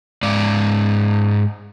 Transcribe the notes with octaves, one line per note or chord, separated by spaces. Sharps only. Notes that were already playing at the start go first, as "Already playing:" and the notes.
G#2 D5